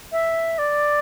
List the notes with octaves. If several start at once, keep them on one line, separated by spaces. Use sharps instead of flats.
E5
D5